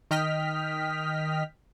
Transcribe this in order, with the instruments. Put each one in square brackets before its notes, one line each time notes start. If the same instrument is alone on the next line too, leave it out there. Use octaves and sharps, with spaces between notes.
[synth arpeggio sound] D#3 D#5 G5 F6 B6